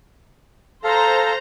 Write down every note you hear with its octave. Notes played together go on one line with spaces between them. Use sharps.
A4 C5 F5 A#5